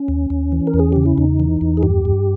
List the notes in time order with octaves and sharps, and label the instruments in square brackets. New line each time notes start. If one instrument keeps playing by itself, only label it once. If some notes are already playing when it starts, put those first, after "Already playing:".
Already playing: [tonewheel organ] C#4
D#2
D#2
E3
A#4
E2
G#4
C#3 G4
E4
E2 D#4
E3
E2
G#4
G2 G4
G2